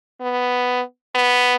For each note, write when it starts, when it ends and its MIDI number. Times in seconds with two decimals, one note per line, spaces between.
0.21 0.81 59
1.15 1.56 59